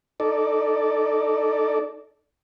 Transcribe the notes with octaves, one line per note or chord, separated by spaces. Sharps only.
D#4 A4 D5